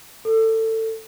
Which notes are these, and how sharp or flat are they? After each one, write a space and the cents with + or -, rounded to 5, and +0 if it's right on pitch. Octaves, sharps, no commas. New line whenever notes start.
A4 +25